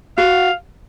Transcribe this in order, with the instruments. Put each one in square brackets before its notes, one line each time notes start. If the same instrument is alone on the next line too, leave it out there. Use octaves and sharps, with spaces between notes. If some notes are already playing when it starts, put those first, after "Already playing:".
[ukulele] F#4 [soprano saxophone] F5